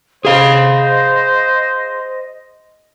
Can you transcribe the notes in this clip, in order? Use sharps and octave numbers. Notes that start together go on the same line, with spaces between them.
G#4 C5 D#5 F5